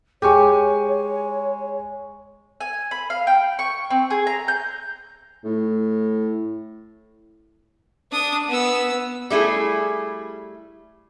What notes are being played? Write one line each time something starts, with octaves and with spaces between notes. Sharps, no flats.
G#3 G4 C#5 G#5 C#6
G#5
B5
F5
G5
C#6
C4
G#4
A#5
G6
A2
D4 D#6
B3 E6
G3 A3 E4 G#4